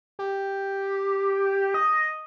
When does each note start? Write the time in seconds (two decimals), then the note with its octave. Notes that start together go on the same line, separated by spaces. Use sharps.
0.19 G4
1.74 D#5